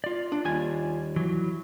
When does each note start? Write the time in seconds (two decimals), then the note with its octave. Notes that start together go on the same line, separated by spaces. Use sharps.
0.04 F4 D5
0.32 D4
0.45 D#2 G3 G#5
1.16 E3 F#3